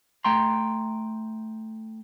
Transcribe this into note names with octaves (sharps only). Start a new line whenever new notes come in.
A3 G5 A#5 C6